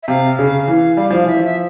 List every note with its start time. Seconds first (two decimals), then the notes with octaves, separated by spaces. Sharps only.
0.03 E5
0.08 C3 F5
0.39 C#3
0.68 E3
0.97 G3 F5
1.10 F3
1.24 E3 E5
1.36 F3
1.45 E5